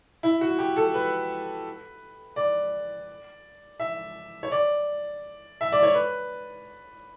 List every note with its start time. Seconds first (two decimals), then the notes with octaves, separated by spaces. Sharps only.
0.23 E4
0.41 F#4
0.59 G4
0.76 A4
0.94 B4
2.36 D5
3.80 E5
4.43 C#5
4.52 D5
5.61 E5
5.72 D5
5.83 C#5
5.94 B4